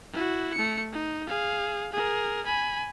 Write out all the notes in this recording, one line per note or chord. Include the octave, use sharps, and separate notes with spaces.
E4 F#4
A3 C#7
D#4
G#4 F5
G#4 A#4
G#5 B5